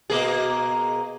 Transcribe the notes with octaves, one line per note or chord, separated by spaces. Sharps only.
B2 A#3 G#4